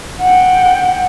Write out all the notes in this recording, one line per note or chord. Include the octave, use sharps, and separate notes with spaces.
F#5 G5